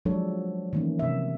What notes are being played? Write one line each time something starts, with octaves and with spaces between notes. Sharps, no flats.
F3 F#3 G#3 D4 A4 C#5
D#3 E3 A3 A#3 C#4
C3 E5